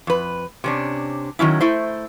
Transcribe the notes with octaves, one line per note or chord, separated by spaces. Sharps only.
F2 B4
C3 C#4 D4
D#3 F#3 C#4 E4
A3 E4 C5